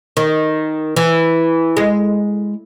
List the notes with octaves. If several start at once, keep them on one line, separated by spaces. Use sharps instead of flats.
D#3
E3
G#3